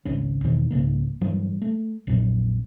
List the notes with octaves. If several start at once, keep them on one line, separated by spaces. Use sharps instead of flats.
G#1 C#2 C#3 C#4
E2 B2 D#3 E3
C2 G#2 C#3 A#3
G2 E3 F#3 G3
A3
A#1 F2 A#2 F#3